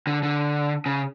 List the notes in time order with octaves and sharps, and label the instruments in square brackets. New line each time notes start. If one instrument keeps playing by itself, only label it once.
[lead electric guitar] D3
D3
C#3